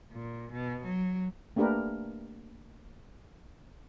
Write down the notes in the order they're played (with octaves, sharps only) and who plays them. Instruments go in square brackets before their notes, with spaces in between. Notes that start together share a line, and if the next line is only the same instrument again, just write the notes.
[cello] A#2
B2
F#3
[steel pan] A3 A#3 D4 G4 A#4 B4